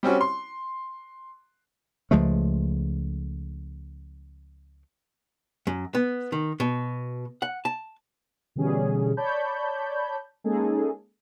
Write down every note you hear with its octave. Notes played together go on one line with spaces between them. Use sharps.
G3 C4 C#4 F#4
C6
C#2 F3 G#3 A3
F#2
B3
D#3
B2
F#5
A5
B2 D3 E3 G3 C#4 G#4
C#5 D5 A5 B5 G6
G#3 A#3 C#4 D#4 G#4 A4